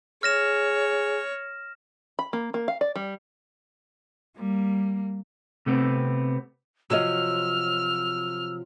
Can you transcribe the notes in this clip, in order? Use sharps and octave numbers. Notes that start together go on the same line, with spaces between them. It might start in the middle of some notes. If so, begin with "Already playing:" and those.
G#4 C#5 F6 A#6 E7
B5
A#3
A#3
F5
D5
G3
G3 A#3
C3 A3 B3 C4
C3 F3 F#3 F#4 C#5 D#5 E6 F6